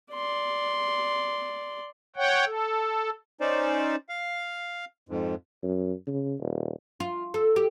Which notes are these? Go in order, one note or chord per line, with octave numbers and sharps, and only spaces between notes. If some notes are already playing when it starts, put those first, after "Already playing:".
D5 C6
C#5 F#5 G5
A4
C#4 D#4 C5 D5
F5
F2 G#2
F#2
C#3
D#1
F4
A4
G4